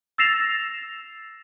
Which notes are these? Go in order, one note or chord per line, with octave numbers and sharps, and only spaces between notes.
E6 A6 A#6 C7 E7 F7